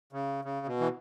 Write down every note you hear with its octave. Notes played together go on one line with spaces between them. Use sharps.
C#3
C#3
B2
E3